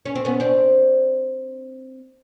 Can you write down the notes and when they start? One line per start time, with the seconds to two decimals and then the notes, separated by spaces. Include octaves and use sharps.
0.05 C#4
0.15 C4
0.25 B3 C#4
0.40 C4 D4